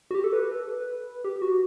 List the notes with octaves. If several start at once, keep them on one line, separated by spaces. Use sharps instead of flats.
F#4
G4
A4
B4
A4
B4
G4
G4
F#4